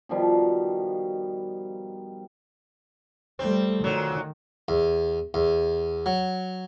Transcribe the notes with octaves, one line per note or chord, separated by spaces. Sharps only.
B2 D#3 F3 G3
G3 A3 C4
A#2 D#3 F#3
E2
E2
F#3